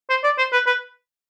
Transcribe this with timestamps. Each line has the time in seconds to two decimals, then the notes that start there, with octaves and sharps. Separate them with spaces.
0.09 C5
0.24 D5
0.38 C5
0.53 B4
0.66 B4